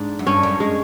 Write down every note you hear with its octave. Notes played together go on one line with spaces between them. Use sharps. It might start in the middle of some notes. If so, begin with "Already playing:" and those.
Already playing: G#2 D4
F#2
G2 C#4
F#2
G#3